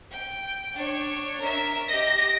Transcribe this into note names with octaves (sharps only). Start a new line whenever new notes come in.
G5
D4 C#5
A#4 E5
G4 D#5 A#6